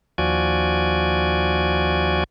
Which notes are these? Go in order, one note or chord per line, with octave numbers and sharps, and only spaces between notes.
D#2 F3 F#4 D5 G#5